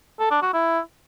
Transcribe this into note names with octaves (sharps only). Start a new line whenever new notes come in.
A4
D4
F#4
E4